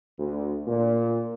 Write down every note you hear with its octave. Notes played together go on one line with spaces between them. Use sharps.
D2
A#2